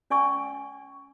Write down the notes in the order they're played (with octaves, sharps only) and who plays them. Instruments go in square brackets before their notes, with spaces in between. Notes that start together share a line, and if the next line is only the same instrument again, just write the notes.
[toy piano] C#4 D5 G#5 C#6 E6